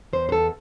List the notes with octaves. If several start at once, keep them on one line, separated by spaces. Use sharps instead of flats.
E2 C5
C5
E2 A4